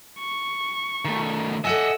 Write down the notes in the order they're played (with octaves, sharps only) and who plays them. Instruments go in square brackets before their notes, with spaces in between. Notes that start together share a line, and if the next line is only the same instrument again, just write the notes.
[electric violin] C#6
[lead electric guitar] D#3 A3
[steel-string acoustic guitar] A4 F#5 G#5 [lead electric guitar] D#5 E5 [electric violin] E6